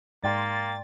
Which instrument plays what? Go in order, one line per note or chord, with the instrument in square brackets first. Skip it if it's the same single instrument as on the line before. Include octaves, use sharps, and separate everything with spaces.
[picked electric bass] G#2 [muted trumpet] A#3 [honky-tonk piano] D5 G5 C6 [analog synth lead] A6